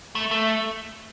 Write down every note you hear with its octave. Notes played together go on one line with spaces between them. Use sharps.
A3
A3